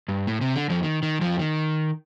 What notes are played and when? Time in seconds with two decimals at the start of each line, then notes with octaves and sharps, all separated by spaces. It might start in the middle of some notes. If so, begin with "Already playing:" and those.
0.08 G2
0.27 A2
0.41 C3
0.56 D3
0.70 F2 F3
0.83 D#3
1.03 D#3
1.21 F2 F3
1.39 D#3